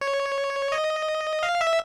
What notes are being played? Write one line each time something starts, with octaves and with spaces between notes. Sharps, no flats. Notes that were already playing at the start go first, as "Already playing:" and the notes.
C#5
D#5
F5
E5